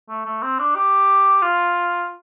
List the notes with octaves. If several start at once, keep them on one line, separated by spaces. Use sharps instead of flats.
A3
A3
C4
D4
G4
F4